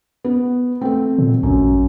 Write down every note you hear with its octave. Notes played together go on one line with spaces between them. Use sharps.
B3
A3 C4
A#2
A1 F#2